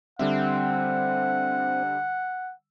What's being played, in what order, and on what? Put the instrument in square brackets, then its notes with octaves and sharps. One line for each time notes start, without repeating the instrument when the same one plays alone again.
[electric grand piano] D3 G3 E5 [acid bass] C4 [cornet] F#5